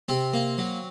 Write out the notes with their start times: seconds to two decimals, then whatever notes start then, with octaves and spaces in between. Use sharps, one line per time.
0.09 C3 C4
0.33 A#3
0.58 F#3